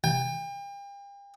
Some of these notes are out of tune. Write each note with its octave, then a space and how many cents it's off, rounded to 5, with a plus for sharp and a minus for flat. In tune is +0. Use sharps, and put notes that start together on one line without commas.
G5 +40